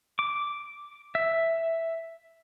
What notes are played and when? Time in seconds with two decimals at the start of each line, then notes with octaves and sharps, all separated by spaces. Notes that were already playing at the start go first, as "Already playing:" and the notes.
0.19 D6
1.15 E5